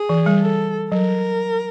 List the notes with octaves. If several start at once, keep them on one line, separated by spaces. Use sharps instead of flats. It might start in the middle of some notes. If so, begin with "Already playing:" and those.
Already playing: G#4
E3
G3
A4
F#3 A#4